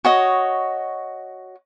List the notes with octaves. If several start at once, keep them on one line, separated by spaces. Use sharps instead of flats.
F#4 C#5 D#5